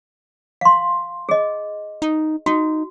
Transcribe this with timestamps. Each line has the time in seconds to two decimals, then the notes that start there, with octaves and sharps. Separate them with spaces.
0.61 F5 C6
1.29 G#4 D#5
2.02 D#4
2.46 D#4 F#4